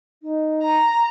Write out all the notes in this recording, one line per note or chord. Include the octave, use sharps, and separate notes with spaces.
D#4
A#5